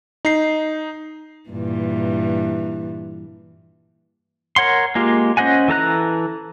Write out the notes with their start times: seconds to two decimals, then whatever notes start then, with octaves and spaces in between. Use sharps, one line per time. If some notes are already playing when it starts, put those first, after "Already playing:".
0.25 D#4 C7
1.50 G2 A#2 E3
4.56 A#4 C#5 F#5 C6
4.95 G#3 A#3 F4 G4
5.37 C#4 C5 D#5 F#5 G#5
5.68 E3 A4 A#5 F#6